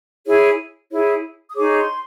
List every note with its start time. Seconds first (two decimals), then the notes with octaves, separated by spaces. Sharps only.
0.26 E4 G#4 C#5
0.91 E4 G#4 C#5
1.50 D#6
1.55 D#4 G#4 C#5 D6
1.78 C6